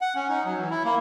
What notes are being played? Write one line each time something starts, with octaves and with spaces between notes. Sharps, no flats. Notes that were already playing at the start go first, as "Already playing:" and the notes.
F#5
C#4
D#4
F#3
E3
E4
A#3